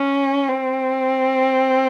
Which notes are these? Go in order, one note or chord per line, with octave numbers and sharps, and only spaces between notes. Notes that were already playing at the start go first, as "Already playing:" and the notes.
Already playing: C#4
C4